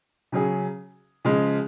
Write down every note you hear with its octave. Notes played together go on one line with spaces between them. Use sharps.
C#3 F#3 C#4 G#4
C#3 F3 G#3